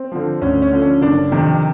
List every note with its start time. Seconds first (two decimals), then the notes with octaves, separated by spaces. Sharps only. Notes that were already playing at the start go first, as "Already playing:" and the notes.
Already playing: C4
0.12 D3 F3
0.41 D2 C#4
0.62 C#4
0.73 D3 F3
0.82 C#4
1.01 F#1 D4
1.31 F2 C3 D#3